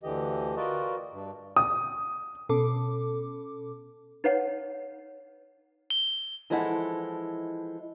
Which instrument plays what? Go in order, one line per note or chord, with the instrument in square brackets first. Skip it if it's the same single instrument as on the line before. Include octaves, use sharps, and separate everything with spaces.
[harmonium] D2 D3 E3 G4 D#5
F4 F#4 A#4 B4 D5 D#5
G2
[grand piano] D#6
[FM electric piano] B2 C#4 A4 D6
[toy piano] D#4 B4 C#5 F#5
[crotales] G7
[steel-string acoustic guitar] E3 F3 G#3 E4 A4 F#5